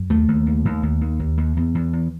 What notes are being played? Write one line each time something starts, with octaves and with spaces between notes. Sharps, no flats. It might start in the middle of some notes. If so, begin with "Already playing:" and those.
Already playing: F#2
D#2 A3
D#2
D#2
D#2
D#2
D#2
D#2
D#2
E2
E2
E2